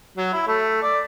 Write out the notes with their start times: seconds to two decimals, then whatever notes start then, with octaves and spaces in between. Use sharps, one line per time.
0.17 F#3
0.33 E4
0.47 A3
0.82 D5